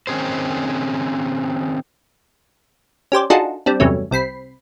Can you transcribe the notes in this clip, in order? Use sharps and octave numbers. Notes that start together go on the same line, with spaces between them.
D#3 C4 C#4 G#4 C5
C#4 G4 C5 D5
D4 D#4 F4 F#4 G#4 A4
G3 C4 D4
E2 G2 C3 F#3 A3 C#4
C2 C4 B5 C7